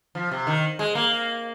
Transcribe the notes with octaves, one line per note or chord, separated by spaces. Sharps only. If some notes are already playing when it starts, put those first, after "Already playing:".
F3
C3
D#3
G#3
A#3